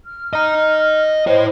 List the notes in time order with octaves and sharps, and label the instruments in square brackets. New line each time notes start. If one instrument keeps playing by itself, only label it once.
[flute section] F6
[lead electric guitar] D#5 A#5
[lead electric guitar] E4 C#5 [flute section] C5 D#5